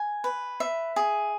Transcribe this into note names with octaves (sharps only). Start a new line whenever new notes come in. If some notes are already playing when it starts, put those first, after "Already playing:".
Already playing: G#5
B4
E5
G#4